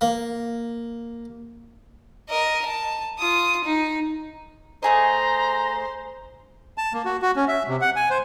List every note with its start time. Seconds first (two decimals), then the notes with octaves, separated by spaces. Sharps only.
0.01 A#3
2.30 A#4 D#5
2.66 A5
3.19 F4 D#6
3.65 D#4
4.83 A3 G#4 C5 D#5 A#5
6.78 A5
6.93 A#3
7.05 F#4
7.22 F#4
7.36 C#4
7.48 E5
7.68 C3
7.81 F#5
7.96 G#5
8.10 C5